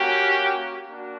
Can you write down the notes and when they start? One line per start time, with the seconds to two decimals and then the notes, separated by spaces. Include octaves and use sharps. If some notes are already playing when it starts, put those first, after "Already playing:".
Already playing: A#3 C#4 F#4 G4
0.88 A#3 D4 F#4